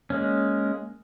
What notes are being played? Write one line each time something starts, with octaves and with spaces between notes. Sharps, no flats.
G#3 A#3 C#4